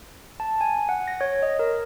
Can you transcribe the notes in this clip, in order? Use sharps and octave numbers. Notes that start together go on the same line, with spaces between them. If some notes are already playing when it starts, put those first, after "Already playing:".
A5
G#5
F#5
A#6
C#5
D#5
A#4